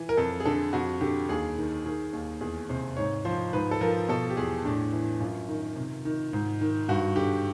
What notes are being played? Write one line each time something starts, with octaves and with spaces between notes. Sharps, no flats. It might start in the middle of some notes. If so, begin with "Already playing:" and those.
Already playing: E3
A#4
F2 A4
G#4
D3 A4
F2 F#4
D3 G4
D#2 G#4
D#3
D#3 G#4
D#2
E2 G#4
C3 C5
G#2 C#5
F3 C5
G#2 B4
A4
F3 A#4
B2 A4
G4
E2 G#4
A2 D4
E3
F#2 F4
D#3
C3
D#3
G#2
D#3
G2 F#4
D3 G4